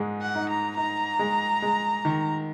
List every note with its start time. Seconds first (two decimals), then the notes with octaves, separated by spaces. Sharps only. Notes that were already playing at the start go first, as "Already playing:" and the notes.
Already playing: G#2 G#3
0.22 F#5
0.35 D#4
0.50 A#5
0.77 D#4 A#5
1.19 G#3
1.62 G#3
2.05 D#3